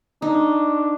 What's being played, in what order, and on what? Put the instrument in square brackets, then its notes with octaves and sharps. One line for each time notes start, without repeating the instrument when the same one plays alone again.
[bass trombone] D4 [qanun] D#4